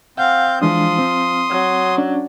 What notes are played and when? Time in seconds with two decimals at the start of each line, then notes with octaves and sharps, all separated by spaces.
0.18 C4 F5 F#5 G6
0.62 E3 F3 G#3 D4 C6 D#6
0.99 C4
1.50 F#3
1.98 C#4 D4 D5